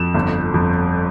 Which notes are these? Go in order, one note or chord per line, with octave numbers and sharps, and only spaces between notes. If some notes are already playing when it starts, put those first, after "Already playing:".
Already playing: F2 E7
G1
F2